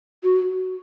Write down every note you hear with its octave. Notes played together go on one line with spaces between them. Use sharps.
F#4